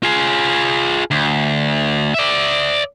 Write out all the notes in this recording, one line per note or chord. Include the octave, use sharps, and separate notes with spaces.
F4 G#4
D2
D5 E5